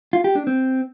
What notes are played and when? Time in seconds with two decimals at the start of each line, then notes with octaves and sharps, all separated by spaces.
0.13 F4
0.24 G4
0.36 D4
0.47 C4